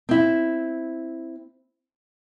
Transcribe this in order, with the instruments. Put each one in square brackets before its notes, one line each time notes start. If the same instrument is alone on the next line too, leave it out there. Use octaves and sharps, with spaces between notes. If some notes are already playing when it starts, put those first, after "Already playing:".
[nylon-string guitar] C4 E4